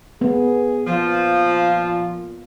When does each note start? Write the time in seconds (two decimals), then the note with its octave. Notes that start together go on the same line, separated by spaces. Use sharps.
0.21 B3 G#4
0.86 A#2 F3 F4